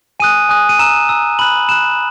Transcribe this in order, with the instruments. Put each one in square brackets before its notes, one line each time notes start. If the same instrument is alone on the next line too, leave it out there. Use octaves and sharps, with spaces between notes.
[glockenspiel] G#5 D#6 F#6 D#7
G#5 D#6 F#6
D#7
A#5 E6 E7
A#5 E6
B5 F#6 F#7
B5 F#6 E7